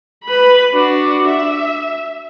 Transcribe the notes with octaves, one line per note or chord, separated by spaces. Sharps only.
B4 B5
D4 F#4
E5